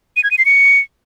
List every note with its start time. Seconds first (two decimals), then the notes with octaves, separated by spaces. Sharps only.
0.16 D#7
0.24 G#6
0.31 D#7
0.38 C7
0.45 C#7